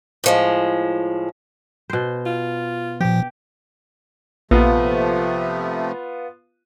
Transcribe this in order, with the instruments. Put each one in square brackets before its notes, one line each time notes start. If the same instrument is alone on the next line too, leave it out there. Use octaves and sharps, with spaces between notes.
[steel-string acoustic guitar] A2 F3 G#3
[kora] B2 C5
[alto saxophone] F4
[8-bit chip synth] A#2 F3 [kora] G4
[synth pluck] A#1 [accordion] C3 F3 A3 [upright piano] B3 F4